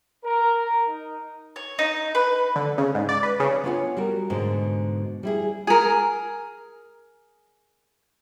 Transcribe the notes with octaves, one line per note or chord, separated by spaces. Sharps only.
A#4
D#4
C#5
D#4
B4
D3
C#3
G#2
D5
B4
C#3
B3 D4 F4 C#5 F#5 G#5
G3 F#4 A#4
G#2 B2 D3
G3 E4 G#4
G#4 A#4